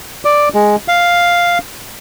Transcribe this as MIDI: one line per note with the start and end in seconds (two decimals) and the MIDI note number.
0.25 0.49 74
0.54 0.76 56
0.88 1.58 77